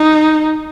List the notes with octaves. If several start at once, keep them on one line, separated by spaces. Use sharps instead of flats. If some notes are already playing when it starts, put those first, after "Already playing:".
Already playing: D#4